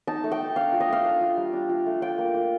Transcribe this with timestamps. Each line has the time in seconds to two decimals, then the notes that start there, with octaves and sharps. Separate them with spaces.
0.07 D#4 A5
0.24 A3
0.32 G5
0.40 D#4
0.56 D4 F5
0.72 F4
0.80 D#5
0.89 A3 F5
1.04 D4
1.21 F4
1.37 G3
1.53 D4
1.69 F4
1.86 A3
2.02 F4 G5
2.18 A#3
2.35 F4